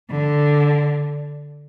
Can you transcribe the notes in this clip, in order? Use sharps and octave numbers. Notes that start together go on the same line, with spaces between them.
D3